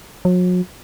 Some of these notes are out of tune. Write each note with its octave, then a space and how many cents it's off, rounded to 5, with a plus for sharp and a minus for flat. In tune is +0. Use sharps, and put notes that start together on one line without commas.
F#3 -40